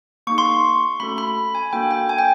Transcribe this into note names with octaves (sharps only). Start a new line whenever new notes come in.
A#3 D#4 G#4 C#6
C6
C#6
A3 C#4 F#4 A4 B5
B5
G#5
A#3 D4 F#4 A4 G5
G5
G#5
G5